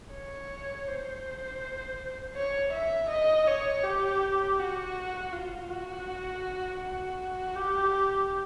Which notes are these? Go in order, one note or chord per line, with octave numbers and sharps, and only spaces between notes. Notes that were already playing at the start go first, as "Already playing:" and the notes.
C#5
C5
C#5
E5
D#5
C#5
G4
F#4
F4
F#4
F#4
G4